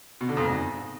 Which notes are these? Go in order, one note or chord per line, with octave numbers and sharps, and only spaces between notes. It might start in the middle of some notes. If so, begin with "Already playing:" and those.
B2
D3
F2
G#2